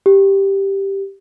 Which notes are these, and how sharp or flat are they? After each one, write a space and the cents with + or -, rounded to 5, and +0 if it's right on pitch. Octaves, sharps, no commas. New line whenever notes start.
G4 +0